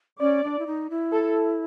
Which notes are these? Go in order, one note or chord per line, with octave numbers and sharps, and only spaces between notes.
C#4 D5
D4
E4
D#4
E4
A4